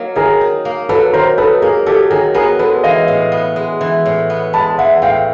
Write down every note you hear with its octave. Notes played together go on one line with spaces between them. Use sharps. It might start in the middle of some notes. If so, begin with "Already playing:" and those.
Already playing: F#3 A#3 D#4
D#3 G#4 A#4
D#4
A#3
F#3 A4 B4
D#3 A#4 C5
D#4 A4 B4
A#3 G#4 A#4
F#3 G4 A4
D#3 G#4 A#4
B3 G#4 A#4
G#3 A4 B4
E3 D#5 F5
A2
B3
G#3
E3
A2
B3
G#3 A5 B5
E3 E5 F#5
A2 F5 G5